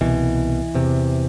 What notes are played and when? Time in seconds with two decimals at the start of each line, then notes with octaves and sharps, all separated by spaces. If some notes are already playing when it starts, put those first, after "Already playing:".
0.01 C2 B2 E3
0.74 E2 C3